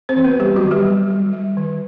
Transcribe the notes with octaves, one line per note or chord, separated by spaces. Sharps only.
C4 C5
E3
B3 B4
G3 G4
F#3 F#4
D#3
G3 G4
G3
G3
G3
D#3